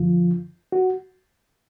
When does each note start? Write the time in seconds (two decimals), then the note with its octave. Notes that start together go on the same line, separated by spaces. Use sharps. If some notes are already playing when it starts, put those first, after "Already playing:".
Already playing: F#2 D3 F3 F4
0.72 F#4